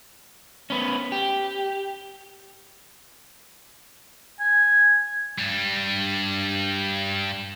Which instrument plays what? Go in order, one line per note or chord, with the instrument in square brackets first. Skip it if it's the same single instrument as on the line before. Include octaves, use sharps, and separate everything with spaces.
[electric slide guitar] B3 C#4
G4
[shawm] G#5
[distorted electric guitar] G2 G3